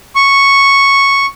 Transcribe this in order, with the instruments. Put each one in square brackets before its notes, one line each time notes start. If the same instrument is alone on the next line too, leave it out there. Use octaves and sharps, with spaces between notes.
[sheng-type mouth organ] C#6